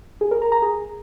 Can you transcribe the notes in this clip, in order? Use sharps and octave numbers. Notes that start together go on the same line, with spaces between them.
G#4
A#4
A#5
A#5
G#4